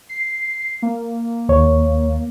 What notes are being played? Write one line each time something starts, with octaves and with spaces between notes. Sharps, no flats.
C7
A#3
D#2 C#5